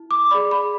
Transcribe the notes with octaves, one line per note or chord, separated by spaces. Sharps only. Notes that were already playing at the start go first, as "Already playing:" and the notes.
Already playing: E4
D6
G#4 D5 B5
B5